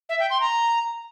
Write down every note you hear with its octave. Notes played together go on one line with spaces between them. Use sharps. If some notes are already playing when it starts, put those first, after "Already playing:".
E5
G5
C6
A#5